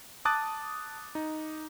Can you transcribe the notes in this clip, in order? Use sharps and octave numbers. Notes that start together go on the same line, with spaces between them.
A5 D6 D#6 F#6 A6
D#4